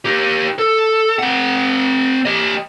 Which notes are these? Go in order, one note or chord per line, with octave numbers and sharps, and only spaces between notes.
D#4 G4
A4
C4 F#5
G4 D#5